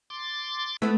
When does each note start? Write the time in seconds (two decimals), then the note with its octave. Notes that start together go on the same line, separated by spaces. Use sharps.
0.10 C6 D6 A6
0.82 A3 B3 E4 B4